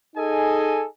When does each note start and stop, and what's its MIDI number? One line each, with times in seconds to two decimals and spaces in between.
0.16 0.86 63
0.16 0.86 68
0.16 0.86 69
0.16 0.86 75
0.16 0.86 80